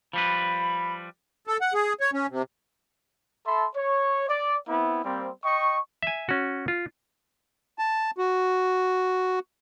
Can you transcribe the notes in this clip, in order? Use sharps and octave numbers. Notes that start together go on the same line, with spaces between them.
F3 G3 B4 B5
A4
F#5
G#4
C#5
C#4
C3
A4 E5 A5 B5 C6
C#5
D5
B3 C4 E4
G3 A#3 C4
D#5 G5 C#6
E5 G#5
C#4 F#4
F4
A5
F#4